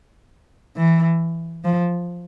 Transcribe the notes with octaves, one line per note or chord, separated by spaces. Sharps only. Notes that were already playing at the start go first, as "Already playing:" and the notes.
E3
F3